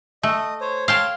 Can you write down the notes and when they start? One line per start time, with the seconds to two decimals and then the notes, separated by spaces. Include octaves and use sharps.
0.23 A3 D#5
0.61 C5 C#5
0.88 C#5 F5 G5 A5 C6